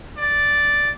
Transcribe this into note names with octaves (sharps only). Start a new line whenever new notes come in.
D5